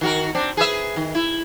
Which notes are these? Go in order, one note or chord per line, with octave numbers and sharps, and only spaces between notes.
D#3 F#4 A#4
C4 D4
G#4 B4 E5
D#3
E4